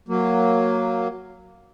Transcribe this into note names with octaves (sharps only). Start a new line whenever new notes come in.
F#3 A#3